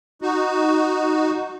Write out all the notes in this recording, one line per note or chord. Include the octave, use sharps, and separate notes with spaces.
D#4 F#4